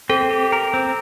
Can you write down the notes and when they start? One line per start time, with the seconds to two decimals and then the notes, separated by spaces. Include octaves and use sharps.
0.09 C4 A4
0.31 G4
0.52 A#4
0.74 C4